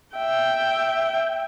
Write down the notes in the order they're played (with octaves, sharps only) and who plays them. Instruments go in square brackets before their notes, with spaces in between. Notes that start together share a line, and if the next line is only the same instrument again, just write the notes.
[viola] E5 G5